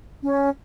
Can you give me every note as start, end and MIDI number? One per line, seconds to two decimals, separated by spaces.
0.23 0.49 61